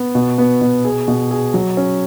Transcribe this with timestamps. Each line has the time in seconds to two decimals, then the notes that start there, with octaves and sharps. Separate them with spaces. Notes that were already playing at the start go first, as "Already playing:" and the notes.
Already playing: B3
0.15 B2
0.38 B3
0.61 B2
0.85 G#4
1.08 B2
1.31 G#4
1.54 F#3
1.77 C#4